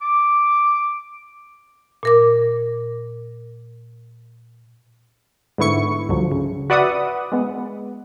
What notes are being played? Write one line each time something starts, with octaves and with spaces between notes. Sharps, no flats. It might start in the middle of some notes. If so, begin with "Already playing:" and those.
D6
A#2 A#4 D6
G#2 D3 B3 E4 C#6 C#7
C#2 G2 D3 F3 F#3
C#3
F#4 B4 D5 E5 F#5 D#6
G#3 B3